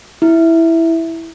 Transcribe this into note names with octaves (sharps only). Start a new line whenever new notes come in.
E4